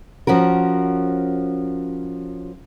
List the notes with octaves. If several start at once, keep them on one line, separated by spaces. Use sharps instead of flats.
F3 C#4 F#4 A#4